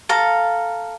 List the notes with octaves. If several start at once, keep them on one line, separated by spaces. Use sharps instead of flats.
A4 F5 A#5